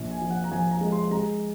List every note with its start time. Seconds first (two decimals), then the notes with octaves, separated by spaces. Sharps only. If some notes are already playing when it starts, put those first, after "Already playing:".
Already playing: A#1
0.11 G#5
0.21 F3
0.31 F#5
0.44 A#5
0.51 F3 G#5
0.71 A#5
0.81 G#3
0.92 C6
1.11 G#3 A#5